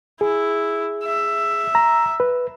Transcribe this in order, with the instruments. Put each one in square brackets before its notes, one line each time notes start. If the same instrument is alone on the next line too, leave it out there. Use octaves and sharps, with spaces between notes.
[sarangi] E4 [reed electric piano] G#4
[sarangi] E5
[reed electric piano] A#5
B4